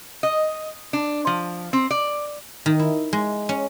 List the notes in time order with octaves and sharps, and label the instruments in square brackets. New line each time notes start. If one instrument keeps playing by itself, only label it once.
[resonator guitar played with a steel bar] D#5
D4
F3
C4
D5
[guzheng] D#3
E4
G#3
C#4